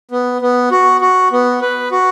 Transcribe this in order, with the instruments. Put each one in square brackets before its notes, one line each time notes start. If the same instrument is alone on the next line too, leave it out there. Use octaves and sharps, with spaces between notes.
[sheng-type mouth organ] B3
B3
F#4
F#4
B3
B4
F#4